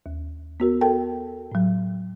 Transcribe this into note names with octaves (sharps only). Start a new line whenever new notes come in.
D#2
B3 F#4 A#4
A4 A#4 G5 A5
A2 F#3